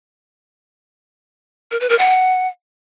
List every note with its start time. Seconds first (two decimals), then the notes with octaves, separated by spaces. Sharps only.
1.71 A#4
1.80 B4
1.90 A#4
1.99 F#5